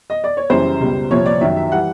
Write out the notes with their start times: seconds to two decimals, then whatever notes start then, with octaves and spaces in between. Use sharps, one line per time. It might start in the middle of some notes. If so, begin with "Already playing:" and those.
0.10 D#5
0.24 D5
0.37 C#5
0.50 F#2 C#3 E3 G3 C5
0.80 C#2 B2 G3
1.10 C2 A#2 F3 C#5
1.26 D5
1.41 F#2 D#3 F#3 E5
1.56 E5
1.71 E3 G3 F#5